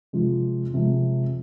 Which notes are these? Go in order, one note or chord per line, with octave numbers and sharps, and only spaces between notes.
C3 F3 G#3 F4
C3 F3 G#3